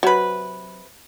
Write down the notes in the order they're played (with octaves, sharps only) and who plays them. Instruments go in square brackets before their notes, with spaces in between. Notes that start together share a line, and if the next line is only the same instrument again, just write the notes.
[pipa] C3 B4 [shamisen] F#3